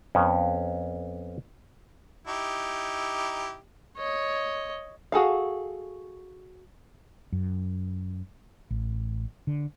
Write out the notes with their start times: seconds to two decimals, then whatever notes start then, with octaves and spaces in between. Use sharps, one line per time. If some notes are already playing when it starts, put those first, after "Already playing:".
0.15 F2 B3 C#4
2.27 D#4 E4 G4
3.97 C#5 D#5
5.12 F#4 G#4 A4 F5
7.32 F#2
8.71 A1
9.47 D3